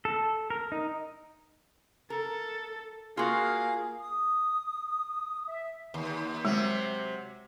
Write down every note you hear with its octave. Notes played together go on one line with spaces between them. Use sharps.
A4
A#4
D#4
A4 A#4
A#3 F4 F#4 G#4 F5
D#6
E5
D#2
C3 F#3 G#3